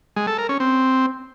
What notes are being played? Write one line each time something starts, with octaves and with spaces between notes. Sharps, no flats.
G#3
A4
A#4
C#4
C4